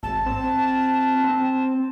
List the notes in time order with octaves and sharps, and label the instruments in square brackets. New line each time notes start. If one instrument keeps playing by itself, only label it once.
[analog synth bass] G#1 [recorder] A5
[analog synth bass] C4
C4